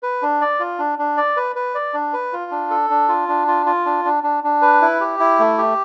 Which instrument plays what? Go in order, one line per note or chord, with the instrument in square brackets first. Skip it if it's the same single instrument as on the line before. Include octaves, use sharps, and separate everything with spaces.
[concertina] B4
D4
D5
F4
D4
D4
D5
B4
B4
D5
D4
B4
F4
D4
A4
D4
F4
D4
F4
F4
D4
D4
D4
D4
B4
E4
G4
E4
A3
G4